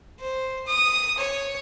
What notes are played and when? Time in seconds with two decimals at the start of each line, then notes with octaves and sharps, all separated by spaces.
0.20 C5
0.67 D#6
1.18 C#5